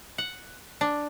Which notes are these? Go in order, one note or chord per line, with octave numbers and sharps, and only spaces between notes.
F#5
D4